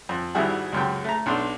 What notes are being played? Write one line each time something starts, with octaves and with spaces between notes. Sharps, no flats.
F2
G#1 G3 E4 F#4 G#4
C#2 F#2 C3 G5
A3 A#5
B1 D4 C6